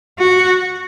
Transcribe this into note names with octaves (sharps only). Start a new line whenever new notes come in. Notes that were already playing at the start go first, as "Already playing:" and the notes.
F#4